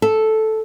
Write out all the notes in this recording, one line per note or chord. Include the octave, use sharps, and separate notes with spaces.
A4